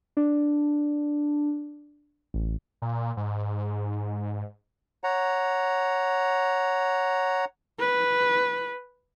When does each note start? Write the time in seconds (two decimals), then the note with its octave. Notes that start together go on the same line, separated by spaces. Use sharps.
0.17 D4
2.34 A1
2.82 A#2
3.17 G#2
5.04 C#5 F#5 A#5
7.79 B4